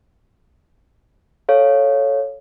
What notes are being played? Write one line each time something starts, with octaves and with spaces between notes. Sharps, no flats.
A4 C#5 F5